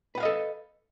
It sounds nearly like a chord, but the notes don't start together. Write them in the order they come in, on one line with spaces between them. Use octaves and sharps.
B4 F#5 F5 D#5 A4